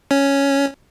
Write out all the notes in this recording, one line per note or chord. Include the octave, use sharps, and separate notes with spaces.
C#4